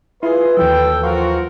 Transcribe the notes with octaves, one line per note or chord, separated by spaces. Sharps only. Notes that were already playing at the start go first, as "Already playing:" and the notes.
E4 F4 G#4 B4
D#2 E3 F#3 A4 G5
F3 F4 F#4 A#4